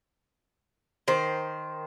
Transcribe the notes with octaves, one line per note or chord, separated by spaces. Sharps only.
D#3 C5